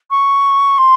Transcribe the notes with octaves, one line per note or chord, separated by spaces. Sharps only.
C#6
C6